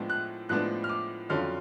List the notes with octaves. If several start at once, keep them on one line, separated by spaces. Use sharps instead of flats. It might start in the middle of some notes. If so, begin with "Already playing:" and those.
Already playing: A2 F3 G#3 B3 D4
F#6
A2 F3 G#3 B3 D4 F#6
F6
D6
F2 D3 F#3 C#4 F4 F6